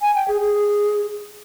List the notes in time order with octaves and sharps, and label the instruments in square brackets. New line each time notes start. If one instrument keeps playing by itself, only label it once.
[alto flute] G#5
G5
G#4
G#4